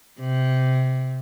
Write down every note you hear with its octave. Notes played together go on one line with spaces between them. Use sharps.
C3